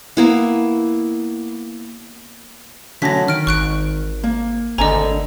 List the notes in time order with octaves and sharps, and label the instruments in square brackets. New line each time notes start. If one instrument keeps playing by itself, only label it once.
[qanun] A#3 B3 E4
[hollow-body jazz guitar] D3 F#3 C#4 [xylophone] A#6 B6
[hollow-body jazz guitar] D#3 [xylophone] F6 D7
[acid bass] G#1 [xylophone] C#6 F#6 D7
[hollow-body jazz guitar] A#3
[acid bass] G#1 [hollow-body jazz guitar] D2 D3 G#5 [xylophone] D#5 A#5